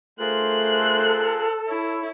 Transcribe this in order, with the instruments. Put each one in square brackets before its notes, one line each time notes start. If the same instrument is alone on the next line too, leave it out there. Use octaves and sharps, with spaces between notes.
[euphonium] A3 [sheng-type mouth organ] F4 G#4 A#4 [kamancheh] C5 F#6
[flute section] A4
[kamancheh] E4 [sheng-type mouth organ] C#5